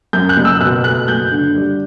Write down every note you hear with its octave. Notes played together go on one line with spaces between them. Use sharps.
F#2 G6
F#6
F#1
E6
B2 F#6
A3 F#6
F#1 G6
D3
G3